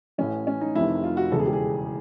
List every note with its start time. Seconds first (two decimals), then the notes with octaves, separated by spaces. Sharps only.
0.18 A1 A2 E3 C#4
0.47 C#4
0.61 D#4
0.75 F1 F2 C3 D#3 E4
1.04 F4
1.17 F#4
1.32 E1 E2 C#3 A4
1.39 G#4
1.46 G4
1.53 G#4